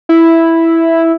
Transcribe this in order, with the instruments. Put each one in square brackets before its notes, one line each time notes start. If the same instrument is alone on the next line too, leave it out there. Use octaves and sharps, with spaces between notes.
[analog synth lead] E4